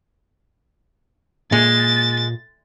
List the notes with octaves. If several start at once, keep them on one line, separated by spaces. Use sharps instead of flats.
A#2 G#3 A6